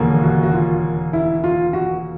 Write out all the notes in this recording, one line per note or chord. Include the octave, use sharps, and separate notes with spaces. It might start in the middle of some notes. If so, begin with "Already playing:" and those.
Already playing: E1 D#2 D3 F3 A#3
F#4
F#4
F4
E4
F4
F#4